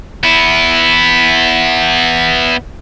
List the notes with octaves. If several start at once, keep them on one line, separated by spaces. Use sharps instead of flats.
B3 E4